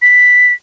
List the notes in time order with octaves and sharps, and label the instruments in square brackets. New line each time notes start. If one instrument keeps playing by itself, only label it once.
[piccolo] B6